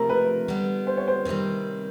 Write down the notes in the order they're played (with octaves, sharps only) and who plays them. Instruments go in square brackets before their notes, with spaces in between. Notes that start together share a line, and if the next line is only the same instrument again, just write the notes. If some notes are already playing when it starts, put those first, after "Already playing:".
Already playing: [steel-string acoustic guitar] C3 F3 A3 [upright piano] A#4
[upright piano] B4
[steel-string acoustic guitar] D3 G3 B3
[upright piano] C5
C#5
C5
[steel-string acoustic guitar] C3 D#3 G3 C4